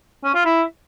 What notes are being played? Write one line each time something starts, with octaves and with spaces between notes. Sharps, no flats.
C#4
F4
E4